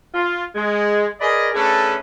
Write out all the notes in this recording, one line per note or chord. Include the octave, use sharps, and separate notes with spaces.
F4
G#3
G#4 A#4 B4 D5 D#5
A3 C#4 D4 G#4 A4 B4